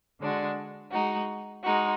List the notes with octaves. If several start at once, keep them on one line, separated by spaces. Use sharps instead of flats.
D3 G#3 D4 F#4
G#3 D#4 F#4
G#3 D#4 F#4